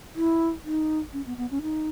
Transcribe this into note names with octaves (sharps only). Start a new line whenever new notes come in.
E4
D#4
C#4
B3
B3
C#4
D#4